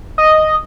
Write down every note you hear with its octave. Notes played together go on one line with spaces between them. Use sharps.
D#5